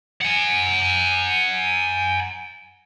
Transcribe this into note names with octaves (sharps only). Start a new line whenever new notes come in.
F#5 G#5